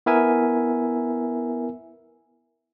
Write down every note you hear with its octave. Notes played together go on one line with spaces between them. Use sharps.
B3 E4 A#4 E5 G#5